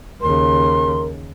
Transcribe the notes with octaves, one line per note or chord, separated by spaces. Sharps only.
D#2 C#3 A#4 C6